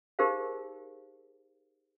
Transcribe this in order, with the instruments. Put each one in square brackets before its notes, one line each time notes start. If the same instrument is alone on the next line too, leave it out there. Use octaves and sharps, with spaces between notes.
[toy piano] D#4 G4 G#4 A#4 C5 F5